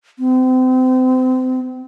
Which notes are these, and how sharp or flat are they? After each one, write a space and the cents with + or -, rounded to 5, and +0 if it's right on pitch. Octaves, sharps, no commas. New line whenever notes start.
C4 -35